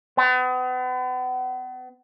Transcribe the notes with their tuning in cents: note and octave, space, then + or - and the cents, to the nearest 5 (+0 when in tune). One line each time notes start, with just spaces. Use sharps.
B3 +40